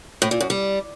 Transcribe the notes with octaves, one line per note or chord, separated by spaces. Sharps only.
A2
A#2
F#2
G3